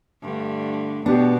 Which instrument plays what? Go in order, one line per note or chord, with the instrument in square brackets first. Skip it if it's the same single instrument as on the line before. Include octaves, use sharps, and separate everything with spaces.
[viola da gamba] G2 D3 A3
[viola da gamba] B2 [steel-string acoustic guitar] B3 [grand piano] D4 G4